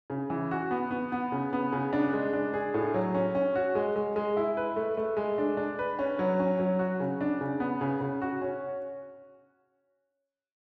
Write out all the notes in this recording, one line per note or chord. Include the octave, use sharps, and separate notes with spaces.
C#3
E3
F#4
B3
B3
B3
C#3
B3
C#3
D4
G#3
D4
G#4
A2
F#3
C#4
C#4
F#4
G#3
G#3
G#3
E4
B4
A3
A3
G#3
D4
D4
B4
C#4
F#3
C#4
F#3
F#4
C#3
D4
C#3
B3
C#3
C#3
F#4
C#4